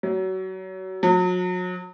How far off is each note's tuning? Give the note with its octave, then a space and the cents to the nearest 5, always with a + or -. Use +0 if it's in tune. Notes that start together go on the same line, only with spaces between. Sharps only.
F#3 +25
F#3 -35